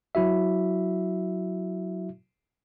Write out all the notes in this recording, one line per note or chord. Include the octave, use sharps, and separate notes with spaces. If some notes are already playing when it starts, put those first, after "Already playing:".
F#3 E4 F#4 E5